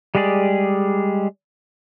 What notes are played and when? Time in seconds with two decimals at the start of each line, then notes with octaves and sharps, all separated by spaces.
0.15 G3 G#3 G4 G#4 D5